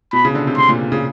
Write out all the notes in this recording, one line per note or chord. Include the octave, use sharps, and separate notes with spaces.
B2 B5
C#3
D3
C3
C3 C6
A#2
C#3